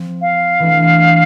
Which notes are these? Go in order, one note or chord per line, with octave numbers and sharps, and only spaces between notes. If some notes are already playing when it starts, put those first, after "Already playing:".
Already playing: F3 C4
F5
E3 A3 D4